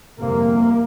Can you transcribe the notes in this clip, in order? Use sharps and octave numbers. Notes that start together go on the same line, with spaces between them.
G1 F2 C3 A#3